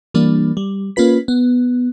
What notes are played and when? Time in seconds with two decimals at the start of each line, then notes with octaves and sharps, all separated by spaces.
0.14 E3 G3 A#3 D4
0.57 G3
0.96 A#3 C#4 F4 B4 B6
1.28 B3